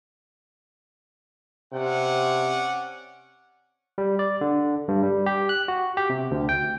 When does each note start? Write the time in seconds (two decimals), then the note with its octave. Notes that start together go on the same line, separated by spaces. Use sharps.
1.73 C3 C#4 D5 F#5
3.98 G3
4.19 D5
4.41 D3
4.88 G2
5.03 G3
5.26 G4
5.49 F#6
5.68 F#4
5.97 G4
6.10 C3
6.31 D2
6.49 G5